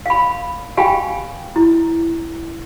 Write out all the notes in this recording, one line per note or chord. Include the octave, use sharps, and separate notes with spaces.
F5 B5
G4 F5 G5 G#5 B5
E4